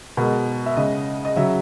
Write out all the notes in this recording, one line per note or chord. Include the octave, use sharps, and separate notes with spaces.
B2 G#3 A#4
E5
C#3 G#3 D#5
D#5
C#3 F#3 E5